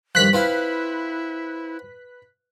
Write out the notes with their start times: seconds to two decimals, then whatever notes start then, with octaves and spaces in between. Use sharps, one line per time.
0.15 G2 D#3 F3 F#6 B6
0.33 C4 E4 F4 B4 F5